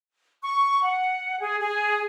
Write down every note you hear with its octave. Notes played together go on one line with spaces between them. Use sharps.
C#6
F#5
G#4
G#4